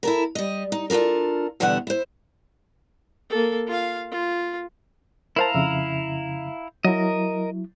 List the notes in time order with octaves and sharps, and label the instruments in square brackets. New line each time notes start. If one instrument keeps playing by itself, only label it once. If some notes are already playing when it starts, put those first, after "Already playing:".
[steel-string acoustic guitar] E4 A4 A#4
G3 D#5
D#4
D4 F4 F#4 A4 A#4
E2 B2 D3 G3 E5 F#5
E4 C5
[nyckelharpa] A#3 A4
F4 F5
F4
[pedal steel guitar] E4 F5 A#5 [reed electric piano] A#4 C5 A5
[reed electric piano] F2 C#3 E5
[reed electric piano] F#3 E4 [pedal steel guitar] A#4 D#5